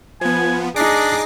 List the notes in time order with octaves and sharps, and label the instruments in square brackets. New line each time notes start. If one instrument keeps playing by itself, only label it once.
[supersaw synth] F3 B3 [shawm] G#5
[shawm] D4 [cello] D#4 G#4 [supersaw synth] D6 A#6 C7